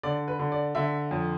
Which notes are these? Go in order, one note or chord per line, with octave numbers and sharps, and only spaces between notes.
D3 D5
B4
D3
D5
D3 E5
F2